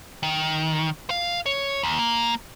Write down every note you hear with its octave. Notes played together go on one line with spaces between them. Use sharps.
D#3
F5
C#5
D#2
A#3